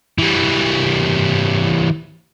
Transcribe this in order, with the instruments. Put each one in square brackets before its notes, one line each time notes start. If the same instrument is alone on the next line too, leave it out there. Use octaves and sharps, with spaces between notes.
[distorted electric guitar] E3 G3